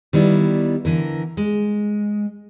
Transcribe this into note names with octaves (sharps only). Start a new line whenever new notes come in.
D#3 G3 B3 E4 D5
D3 E3 A#4
G#3